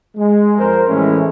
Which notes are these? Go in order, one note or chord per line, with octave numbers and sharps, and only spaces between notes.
G#3
F2 A#4 C5
A2 E3 G#3 A3 C#4 E4